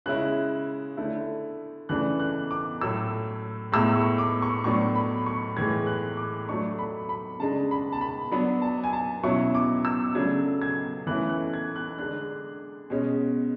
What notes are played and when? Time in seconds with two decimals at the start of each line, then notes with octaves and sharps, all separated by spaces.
0.06 C#3 G#3 C#4 E4 F#6
0.97 D3 A3 E4
1.89 C#3 E3 A3 D4 F#6
2.20 F#6
2.51 D6
2.81 A2 F#3 A3 E6
3.72 A2 G#3 B3 E4 E6
3.96 C#6
4.18 D6
4.42 C#6
4.64 A2 F#3 B3 D4 C#6
4.95 B5
5.26 C#6
5.56 A2 E3 G#3 G#6
5.87 F#6
6.17 D6
6.48 F#3 A3 D4 C#6
6.79 B5
7.09 B5
7.40 C#3 G#3 D4 A5
7.71 B5
7.92 A5
8.01 B5
8.31 F#3 B3 D4 B5
8.62 A5
8.84 G#5
8.93 A5
9.23 B2 F#3 C#4 E4 C#6
9.54 D6
9.85 E6
10.15 C#3 F#3 A3 D4 G#6
10.61 G#6
11.07 E3 A3 C#4 E4 F#6
11.29 F#6
11.54 G#6
11.76 F#6
11.99 D3 G#3 D4 F#6
12.90 B2 G#3 C#4